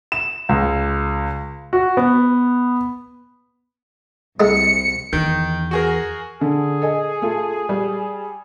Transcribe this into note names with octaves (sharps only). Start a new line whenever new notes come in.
E7
C#2
F#4
B3
C2 G#3 A3 D#4 C#7
E2 D#3
F#4 G#4 A#4
D3 G#4
A4 D#5 G#5
A3 F4
G3